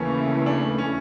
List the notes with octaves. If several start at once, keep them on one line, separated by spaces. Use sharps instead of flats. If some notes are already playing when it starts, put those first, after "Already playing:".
Already playing: D#2 C#3 E3 A3 C#4
D4
C#4